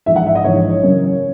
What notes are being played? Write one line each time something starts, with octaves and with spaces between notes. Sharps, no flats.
A#1 G#2 E3 E5
F#5
E5
D#5
A#1 G#2 E3 C#5
F#2 C#3 E3 A#3 C#4